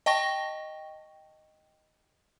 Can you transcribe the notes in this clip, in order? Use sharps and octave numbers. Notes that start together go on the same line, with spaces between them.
D#5 G5 A5 C#6 A#6